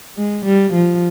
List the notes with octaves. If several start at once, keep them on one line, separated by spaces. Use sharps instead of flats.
G#3
G3
F3